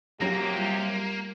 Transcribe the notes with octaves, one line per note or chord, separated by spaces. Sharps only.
G#2 C3 F#3 A#3 G4 A#5 A#6
G3 F4